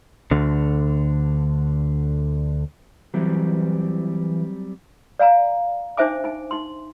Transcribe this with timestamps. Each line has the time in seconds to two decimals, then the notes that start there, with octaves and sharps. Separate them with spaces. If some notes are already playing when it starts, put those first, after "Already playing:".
0.31 D2 D3
3.14 E3 F#3 G3 C4
5.19 D5 F5 G#5 A#5
5.97 D4 D#4 C5 E5 G#5 D6
6.24 D#4 G#5
6.51 D#4 C6